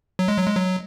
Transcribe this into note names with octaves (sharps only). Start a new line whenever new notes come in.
F#3
G#3
F#3
G#3
F#3